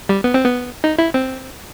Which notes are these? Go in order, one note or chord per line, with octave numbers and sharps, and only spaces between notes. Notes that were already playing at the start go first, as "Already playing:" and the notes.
G3
B3
C4
B3
D#4
E4
C4